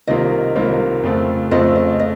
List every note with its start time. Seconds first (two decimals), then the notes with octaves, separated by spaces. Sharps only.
0.07 C2 C3 D#3 A#3 F4 D#5
0.56 C2 C3 D#3 A#3 F4
1.03 F2 C#3 A3 C4 F4
1.51 F2 C#3 A3 C4 F4 D#5
1.76 D#5
1.99 D#5